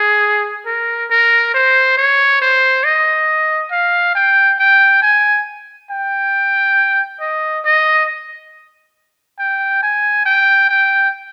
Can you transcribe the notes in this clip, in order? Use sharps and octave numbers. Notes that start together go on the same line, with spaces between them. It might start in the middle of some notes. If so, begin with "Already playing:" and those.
Already playing: G#4
A#4
A#4
C5
C#5
C5
D#5
F5
G5
G5
G#5
G5
D#5
D#5
G5
G#5
G5
G5